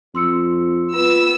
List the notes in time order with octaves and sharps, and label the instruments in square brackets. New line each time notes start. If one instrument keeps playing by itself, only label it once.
[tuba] F2 [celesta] C6 E6 C#7
[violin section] B3 E6 [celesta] F4